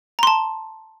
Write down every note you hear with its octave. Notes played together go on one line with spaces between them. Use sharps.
A5 A#5 C6